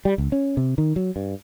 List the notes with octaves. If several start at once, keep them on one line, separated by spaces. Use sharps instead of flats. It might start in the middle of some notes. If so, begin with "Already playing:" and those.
G3
C#2
C#4
C3
D#3
F#3
G2